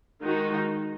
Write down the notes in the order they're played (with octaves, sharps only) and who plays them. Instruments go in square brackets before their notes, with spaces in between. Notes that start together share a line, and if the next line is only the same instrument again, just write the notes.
[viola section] D#3 G#3 D#4 F#4